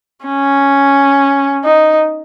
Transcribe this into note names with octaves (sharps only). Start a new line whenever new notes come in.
C#4
D#4